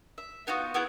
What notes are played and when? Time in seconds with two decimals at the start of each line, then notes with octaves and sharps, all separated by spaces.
0.18 E5
0.47 B3 D#4 F4 F#4
0.74 B3 E4 F#4 G#4